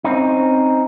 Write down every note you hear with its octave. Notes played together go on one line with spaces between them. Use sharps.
C4 C#4 D#4